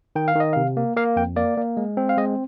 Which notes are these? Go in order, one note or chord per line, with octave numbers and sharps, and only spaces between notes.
D#3 G5
F5
D#3 D#5
C3 F5
A#3
A#3 F5
F2 G5
A#3 D5
A#3
G#3
C4
F5
G#3 D#5